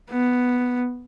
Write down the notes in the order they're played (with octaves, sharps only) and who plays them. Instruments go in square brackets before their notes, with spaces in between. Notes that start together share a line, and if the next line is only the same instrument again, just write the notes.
[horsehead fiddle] B3